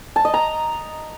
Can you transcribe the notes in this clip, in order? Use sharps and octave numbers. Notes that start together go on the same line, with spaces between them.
A5
D#5
A#5